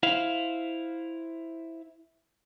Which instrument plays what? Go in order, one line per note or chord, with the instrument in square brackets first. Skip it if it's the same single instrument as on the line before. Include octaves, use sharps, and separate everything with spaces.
[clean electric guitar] E4 C5 F5